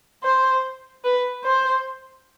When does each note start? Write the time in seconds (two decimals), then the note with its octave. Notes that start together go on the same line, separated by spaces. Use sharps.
0.23 C5
1.04 B4
1.44 C5